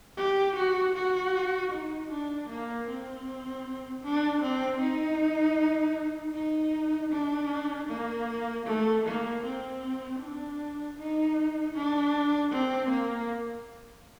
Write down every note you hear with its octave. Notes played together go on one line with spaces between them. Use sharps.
G4
F#4
F#4
D#4
D4
A#3
C4
D4
C4
D#4
D#4
D4
A#3
A3
A#3
C4
D4
D#4
D4
C4
A#3